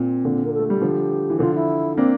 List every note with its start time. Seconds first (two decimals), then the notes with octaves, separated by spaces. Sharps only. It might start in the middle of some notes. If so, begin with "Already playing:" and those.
Already playing: A#2 C4
0.25 A#2 D3
0.45 A#4
0.53 A4
0.59 A3
0.68 G3 G4
0.82 D3 F3
1.30 E3
1.39 D3 F3 F4
1.54 E4
1.96 A#3 C4 D4